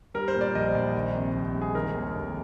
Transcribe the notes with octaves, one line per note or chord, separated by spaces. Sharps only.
G3 A#4
C5
A#2
D5
A#1 D#5
A#1
D#3
C3
C2
G#3
G#4
D#3 A#4
D#2
F1